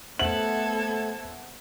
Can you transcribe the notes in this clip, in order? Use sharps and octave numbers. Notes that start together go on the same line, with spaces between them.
A3 B3 A4 C5 E5 F#5 G#6 F#7